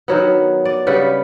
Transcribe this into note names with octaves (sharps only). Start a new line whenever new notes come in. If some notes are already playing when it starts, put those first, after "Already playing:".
D#3 F#3 B3
D5
C#3 G3 B3 B4